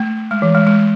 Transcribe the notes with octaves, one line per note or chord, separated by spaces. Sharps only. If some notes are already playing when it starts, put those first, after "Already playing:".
Already playing: A3
G#3
E3
G#3
G#3